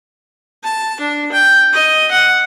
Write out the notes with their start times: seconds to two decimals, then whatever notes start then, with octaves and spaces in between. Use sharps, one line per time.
0.64 A5
1.00 D4
1.32 G5
1.73 D#5
2.11 F#5